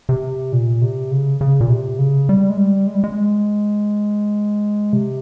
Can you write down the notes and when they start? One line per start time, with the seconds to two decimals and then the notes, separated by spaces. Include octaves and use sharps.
0.09 C3
0.53 A#2
0.82 C3
1.11 C#3
1.41 C#3
1.61 A#2
1.70 C3
1.99 C#3
2.29 G3
2.50 G#3
2.57 G3
2.87 G#3
2.95 G3
3.04 G#3
4.93 C3